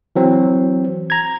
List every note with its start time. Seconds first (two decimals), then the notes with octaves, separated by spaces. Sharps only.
0.16 E3 F#3 C4
1.10 A#5 G#6